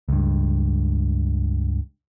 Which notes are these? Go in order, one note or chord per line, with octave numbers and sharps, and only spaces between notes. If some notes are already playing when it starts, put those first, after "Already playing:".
C#2 G2